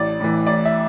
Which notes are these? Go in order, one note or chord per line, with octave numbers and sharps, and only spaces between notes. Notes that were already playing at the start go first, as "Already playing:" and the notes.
Already playing: A1 D5
A2 E3
A1 D5
E5